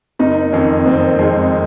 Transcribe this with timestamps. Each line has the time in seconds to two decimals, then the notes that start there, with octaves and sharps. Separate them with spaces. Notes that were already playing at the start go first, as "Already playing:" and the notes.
0.19 F#1 D#4
0.52 F2 D#3 C#4
0.86 F#1 C4
1.19 F2 D#3 G#3